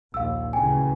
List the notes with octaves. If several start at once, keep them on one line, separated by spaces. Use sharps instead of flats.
A#1 D#2 F5 E6
D2 C#3 E3 G5 G#5